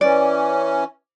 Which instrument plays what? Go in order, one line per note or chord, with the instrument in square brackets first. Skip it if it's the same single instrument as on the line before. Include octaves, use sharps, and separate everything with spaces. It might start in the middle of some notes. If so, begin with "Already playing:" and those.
[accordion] E3 C#4 [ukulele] D5